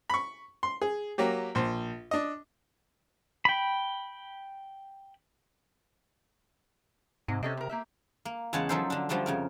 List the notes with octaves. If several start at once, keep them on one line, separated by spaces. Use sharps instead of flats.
B5 C#6
C6
G#4
F#3 A#3 G4
A#1 C5
D4 D#5
G5 B5
G#2 C3
C3 C#4 A4 D#5
C#3 A#4
A#3 G4 E5
A#3
E2 C#3 G#3 C#5 F#5 A5
F3 F#3 D#4 A4 A#4 C5
D3 D4
D3 F3 G3 A3 D4
F2 C#3 A#4